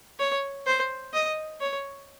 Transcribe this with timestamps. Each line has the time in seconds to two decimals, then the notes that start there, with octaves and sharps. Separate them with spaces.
0.19 C#5
0.66 C5
1.14 D#5
1.60 C#5